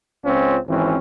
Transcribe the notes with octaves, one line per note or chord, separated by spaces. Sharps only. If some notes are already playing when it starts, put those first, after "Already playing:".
C#2 C4 C#4 F4
G#1 E3 C4 C#4